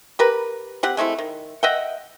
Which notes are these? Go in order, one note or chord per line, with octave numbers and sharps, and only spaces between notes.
G4 A#4 B4
C4 G4 F#5
G#3 A3 C4 E4
D#3
D#5 E5 F#5 G5